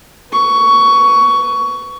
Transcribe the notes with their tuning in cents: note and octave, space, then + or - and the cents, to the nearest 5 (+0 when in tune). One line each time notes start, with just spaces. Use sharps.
B4 +20 C#6 +15